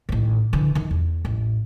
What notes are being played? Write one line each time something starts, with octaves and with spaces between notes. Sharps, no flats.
A1 D#3
D3 E3
D#3 E3
E2
A1